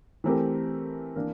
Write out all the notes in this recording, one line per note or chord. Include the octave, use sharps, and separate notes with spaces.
E3 A3 C4 G4 A#4
E3 A#3 D4